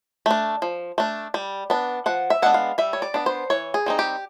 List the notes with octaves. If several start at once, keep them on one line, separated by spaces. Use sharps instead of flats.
A3 D4
F3
A3 D4
G3
B3 D4
F3 F#5
E5
G#3 B3 D4 F#5
F5
G3 E5
C#5
D5
B3 D4
C5
E3 C#5
G#4
G3 C4 D#4
G4